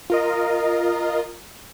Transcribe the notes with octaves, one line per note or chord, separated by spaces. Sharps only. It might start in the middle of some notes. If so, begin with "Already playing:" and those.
F4 A#4 D#5